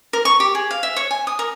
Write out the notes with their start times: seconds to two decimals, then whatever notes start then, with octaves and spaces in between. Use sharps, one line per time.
0.13 A#4
0.25 C#6
0.40 G4
0.55 G#4
0.71 F5
0.83 E5
0.96 C#5
1.11 G#5
1.27 D#6
1.39 A#4